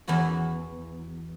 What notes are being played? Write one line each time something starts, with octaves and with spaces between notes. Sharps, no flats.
E2 E3 E4 F#4